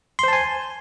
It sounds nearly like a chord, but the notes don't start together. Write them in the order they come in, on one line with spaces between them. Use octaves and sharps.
C6 C5 A5 G#5